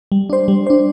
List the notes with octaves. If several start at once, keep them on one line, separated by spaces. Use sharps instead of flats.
G3
D4 C5
G3
D4 C5